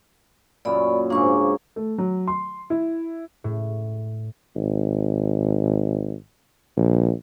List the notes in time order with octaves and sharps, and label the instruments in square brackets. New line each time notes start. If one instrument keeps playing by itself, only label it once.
[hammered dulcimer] F#2 A#2 [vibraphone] D5 B5
[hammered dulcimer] G#2 C#3 A#3 [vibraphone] D4 C#6
[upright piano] A3
F#3
C6
E4
[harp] A2
[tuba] G#1
A#1